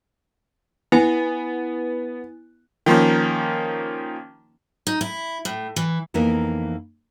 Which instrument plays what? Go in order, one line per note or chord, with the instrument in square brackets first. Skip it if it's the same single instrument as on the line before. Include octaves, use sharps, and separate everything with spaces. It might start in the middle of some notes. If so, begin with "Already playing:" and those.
[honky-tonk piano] B3 [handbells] E4 G#5
[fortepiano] D#3 F3 A#3 C#4
[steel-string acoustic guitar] D#4
E4
A2
E3
[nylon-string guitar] F2 E3 A#3 B3 D#4 A#4